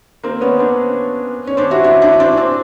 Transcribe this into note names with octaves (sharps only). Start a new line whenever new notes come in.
A#3 C4
B3 C#4
C4 D4
C#4
C4 D4
E4 F#4
D4 E4
D4 E4
C4 D4
C4 D4